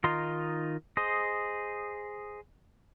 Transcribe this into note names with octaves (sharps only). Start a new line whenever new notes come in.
D#3 D#4 F4 C6
G#4 C5 D#5